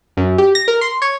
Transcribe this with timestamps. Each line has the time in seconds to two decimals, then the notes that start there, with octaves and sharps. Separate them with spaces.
0.17 F#2
0.38 G4
0.55 A#6
0.68 A#4
0.81 C6
1.02 C#5